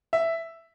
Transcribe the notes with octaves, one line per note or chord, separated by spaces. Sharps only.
E5